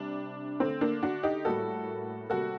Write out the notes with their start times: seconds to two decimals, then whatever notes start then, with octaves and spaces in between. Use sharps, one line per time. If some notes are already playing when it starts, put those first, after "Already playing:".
Already playing: C3 G3 D4
0.60 D3 A3 C4
0.81 A#3 D4
1.03 D4 F#4
1.23 D#4 G4
1.45 A2 G3 A#3 F#4 A4
2.29 C3 G3 A#3 F#4 A4